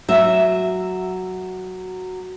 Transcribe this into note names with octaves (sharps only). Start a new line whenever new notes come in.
F#3 E5